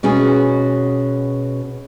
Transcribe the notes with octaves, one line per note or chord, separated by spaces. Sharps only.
B2 C#4 F#4 G#4